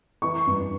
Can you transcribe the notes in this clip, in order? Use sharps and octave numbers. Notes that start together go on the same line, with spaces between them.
E3 C#6
G2